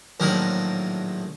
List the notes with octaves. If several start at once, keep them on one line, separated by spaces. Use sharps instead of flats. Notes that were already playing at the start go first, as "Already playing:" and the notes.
A#1 A2 D#3 F#3 A#4